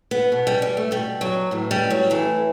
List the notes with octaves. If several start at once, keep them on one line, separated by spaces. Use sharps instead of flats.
B3
B2
G3
G3
A3
B2 G3
F#3
A2 E3
G3
F#3
A2 E3 A3